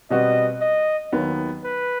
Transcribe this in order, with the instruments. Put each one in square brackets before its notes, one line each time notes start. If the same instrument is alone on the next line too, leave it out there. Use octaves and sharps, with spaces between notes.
[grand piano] B2 G3 C4 F#4 B4 [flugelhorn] D#5
[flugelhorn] D#5
[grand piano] D#2 D#3 F#3 B3
[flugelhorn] B4